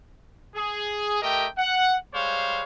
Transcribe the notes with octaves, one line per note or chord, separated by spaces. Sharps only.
G#4
A3 G4 A#4 D#5 G5
F#5
G3 G#3 C5 C#5 F5